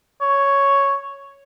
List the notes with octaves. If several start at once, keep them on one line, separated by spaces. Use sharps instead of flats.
C#5